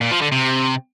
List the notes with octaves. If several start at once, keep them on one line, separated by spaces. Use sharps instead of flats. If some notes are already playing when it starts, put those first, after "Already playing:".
A#2
F3
D3
C3